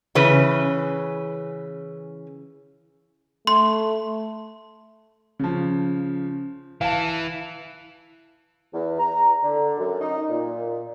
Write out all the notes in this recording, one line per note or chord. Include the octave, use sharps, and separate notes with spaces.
C#3 E3 C#4 B4
A3 C6
C#3 F3
E3 F5 A5
E2
A#5
D3
F#2
D#4
A#2